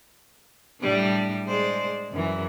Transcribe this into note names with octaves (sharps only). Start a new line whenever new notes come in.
A2 G3 D4
G#3 C5 D5
F#2 E3